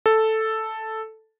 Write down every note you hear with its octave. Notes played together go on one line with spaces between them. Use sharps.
A4